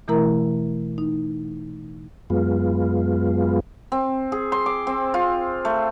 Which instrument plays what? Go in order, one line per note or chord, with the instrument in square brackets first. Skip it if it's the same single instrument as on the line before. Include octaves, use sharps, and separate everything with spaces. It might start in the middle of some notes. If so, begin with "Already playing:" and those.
[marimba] B2 E3 A3 E4 A#4 A#5
D#4
[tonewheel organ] F#2 G#3 B3 F4
[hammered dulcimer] C4
G#4
C6
D6
C4
F4
A3